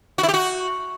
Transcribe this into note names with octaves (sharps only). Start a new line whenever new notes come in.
F#4
E4
G4
F#4